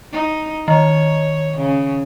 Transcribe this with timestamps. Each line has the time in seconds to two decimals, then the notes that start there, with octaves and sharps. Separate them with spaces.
0.13 D#4
0.68 D#3 C#5
1.57 C#3